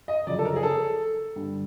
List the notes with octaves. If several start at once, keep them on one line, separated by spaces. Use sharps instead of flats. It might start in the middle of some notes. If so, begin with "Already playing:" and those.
D#5
F#2 C#3 F3 D5
A4
A#4
G#4
A4
G2 D3 G3